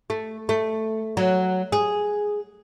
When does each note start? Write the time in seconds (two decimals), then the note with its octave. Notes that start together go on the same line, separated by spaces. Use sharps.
0.10 A3
0.49 A3
1.17 F#3
1.72 G#4